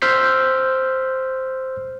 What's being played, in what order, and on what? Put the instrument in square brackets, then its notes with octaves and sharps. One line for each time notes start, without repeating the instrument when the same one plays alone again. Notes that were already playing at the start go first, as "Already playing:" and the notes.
[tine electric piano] C5 E6 F6 G6 B6 C7